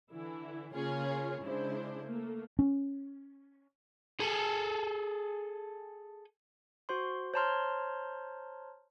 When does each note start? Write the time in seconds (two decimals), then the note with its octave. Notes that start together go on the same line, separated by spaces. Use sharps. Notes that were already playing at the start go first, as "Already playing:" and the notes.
0.12 D3 E3 E4
0.75 C#3 A#3 C#4 F4 G#4 C#5
1.42 C#3 G#3 D4 E4 C5
2.04 A3 A#3
2.59 C#4
4.20 G#4 A4
6.89 F#4 C5 C6
7.34 C5 C#5 A5 A#5 C6 F6